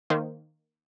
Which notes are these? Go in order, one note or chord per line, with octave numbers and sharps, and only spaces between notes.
D#3 A#3 C5